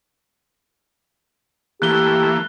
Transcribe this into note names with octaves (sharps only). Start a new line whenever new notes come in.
E3 A3 A#3 G4 F#6 G7